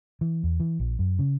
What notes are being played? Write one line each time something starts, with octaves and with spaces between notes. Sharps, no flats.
E3
E2
E3
A#1
F#2
C#3